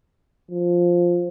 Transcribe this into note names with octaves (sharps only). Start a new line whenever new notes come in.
F3